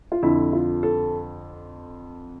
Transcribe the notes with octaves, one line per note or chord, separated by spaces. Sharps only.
F4
F2 D3 E4
F4
A4